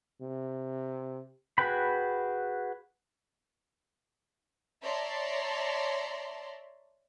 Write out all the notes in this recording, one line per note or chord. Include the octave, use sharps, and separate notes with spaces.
C3
F#4 G#4 B4 G5 B5
C#5 D5 E5 A5 A#5 C6